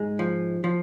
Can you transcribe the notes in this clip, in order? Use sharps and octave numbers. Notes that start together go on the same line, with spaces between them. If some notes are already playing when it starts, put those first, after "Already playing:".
Already playing: G#2 G#3
F3
F3